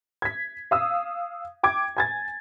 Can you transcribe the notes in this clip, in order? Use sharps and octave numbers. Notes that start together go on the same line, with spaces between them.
G#6 B6
F5 D#6 E6
G5 D6 G#6
G#5 G#6 A6